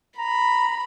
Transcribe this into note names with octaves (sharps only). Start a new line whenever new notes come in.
A#5 B5